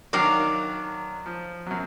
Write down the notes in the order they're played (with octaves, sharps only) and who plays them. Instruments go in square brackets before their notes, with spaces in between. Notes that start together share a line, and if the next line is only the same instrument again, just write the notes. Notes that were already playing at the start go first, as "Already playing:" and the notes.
[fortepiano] D#3 F#3 D4 [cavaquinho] A#4 F5 D6
[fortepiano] F3
F#2 F#3